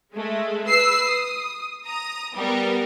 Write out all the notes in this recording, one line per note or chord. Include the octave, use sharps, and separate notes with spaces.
G#3 A3
B4 E6 C7
D#6
A#5 D#6
G3 B3 A#4